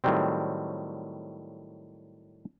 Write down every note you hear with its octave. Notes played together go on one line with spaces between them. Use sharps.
A2 D#3 F#3 G3 C4